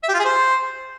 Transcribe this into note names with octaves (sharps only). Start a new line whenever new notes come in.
E5
G4
F4
G#4
C5